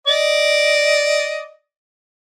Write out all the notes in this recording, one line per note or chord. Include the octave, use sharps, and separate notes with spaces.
D5 D#5